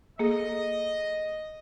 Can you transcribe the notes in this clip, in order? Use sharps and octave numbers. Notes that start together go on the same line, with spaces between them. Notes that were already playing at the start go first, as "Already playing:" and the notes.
A#3 G#4 A4 D#5